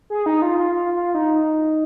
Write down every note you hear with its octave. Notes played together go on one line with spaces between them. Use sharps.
G#4
D#4
F4
F4
F4
F4
D#4